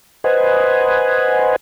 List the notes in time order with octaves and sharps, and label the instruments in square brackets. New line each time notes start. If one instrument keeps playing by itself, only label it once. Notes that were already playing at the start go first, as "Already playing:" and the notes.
[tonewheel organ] B4 C5 D#5 F#5 G#5